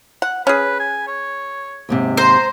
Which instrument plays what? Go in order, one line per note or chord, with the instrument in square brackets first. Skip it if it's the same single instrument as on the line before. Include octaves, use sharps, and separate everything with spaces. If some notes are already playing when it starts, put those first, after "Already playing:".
[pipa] F#5
[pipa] C#4 G#4 [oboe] B4
[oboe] G#5
C#5
[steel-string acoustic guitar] D#2 G#2 C3
[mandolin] C5 [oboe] A#5